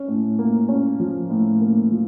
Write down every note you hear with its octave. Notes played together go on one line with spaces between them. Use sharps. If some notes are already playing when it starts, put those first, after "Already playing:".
Already playing: C#4
A2
A#3
C#4
F3
A2
A#3
F3